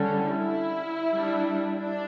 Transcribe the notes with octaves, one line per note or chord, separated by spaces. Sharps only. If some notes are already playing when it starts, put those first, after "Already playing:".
Already playing: D3 G3 C#4
E4
G3 D4
D4